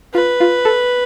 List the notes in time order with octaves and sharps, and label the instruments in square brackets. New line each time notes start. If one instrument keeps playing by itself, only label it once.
[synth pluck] F4 [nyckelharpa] B4
[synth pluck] F4
A4